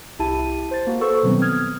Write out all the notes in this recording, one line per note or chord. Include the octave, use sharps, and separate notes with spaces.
C2 E4 G4 A5 D#7
C5 A6
A#3 F#4
A4 B4 C5 C#6 E6
B2 D#3 F#3 G3 B3 C4
D#6 F6 G#6